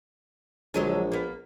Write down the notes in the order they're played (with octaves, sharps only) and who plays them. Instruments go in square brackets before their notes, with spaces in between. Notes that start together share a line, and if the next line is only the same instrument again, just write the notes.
[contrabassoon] A#1 [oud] D3 F#3 G#3
[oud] A#3 B3